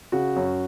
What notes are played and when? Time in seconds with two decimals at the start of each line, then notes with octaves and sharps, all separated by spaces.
0.12 C#3 F#4
0.36 F#2